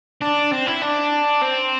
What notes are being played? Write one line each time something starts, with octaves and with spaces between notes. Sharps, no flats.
D4
C4
E4
D4
C4